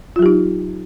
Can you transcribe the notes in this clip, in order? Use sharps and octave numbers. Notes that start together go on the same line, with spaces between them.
F#3 D#4 F4 G4